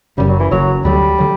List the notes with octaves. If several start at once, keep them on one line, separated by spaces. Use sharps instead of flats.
F#1 F#2 C#3 G3
F#3
E3
F#1 F#2 C#3 F#3
D2 D3 F#3 G3
D3 F#3